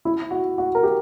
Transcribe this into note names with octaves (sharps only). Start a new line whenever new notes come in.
E4
F#4
F#4
A#4
G4